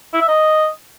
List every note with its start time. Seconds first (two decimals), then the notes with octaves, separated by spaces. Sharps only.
0.14 E4
0.21 E5
0.28 D#5